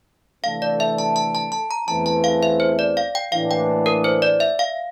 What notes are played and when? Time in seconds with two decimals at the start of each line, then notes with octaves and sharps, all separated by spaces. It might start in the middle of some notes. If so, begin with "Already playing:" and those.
0.44 C3 E3 A3 D4 A4 F5
0.62 D5
0.80 E5
0.98 A5
1.16 A5
1.35 A5
1.52 A5
1.71 A#5
1.88 E2 E3 A3 C4 A5
2.06 A5
2.24 F5
2.43 E5
2.60 C5
2.79 D5
2.97 F5
3.15 G5
3.32 A2 E3 A#3 D4 F5
3.51 G5
3.86 A#4
4.04 C5
4.22 D5
4.40 E5
4.59 F5